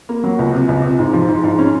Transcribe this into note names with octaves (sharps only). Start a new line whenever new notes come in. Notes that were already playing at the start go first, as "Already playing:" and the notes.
A#3
F#3
C#2
C3
C#2
C3
G#2
F3
G#2
G#2
C#4